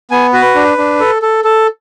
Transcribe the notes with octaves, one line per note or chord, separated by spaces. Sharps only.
B3 G#5
F#4 B4
D4
D4
A4
A4
A4